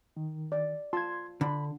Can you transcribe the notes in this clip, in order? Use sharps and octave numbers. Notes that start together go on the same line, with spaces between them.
D#3
D5
F4 A5 C6 G#6
D3 B5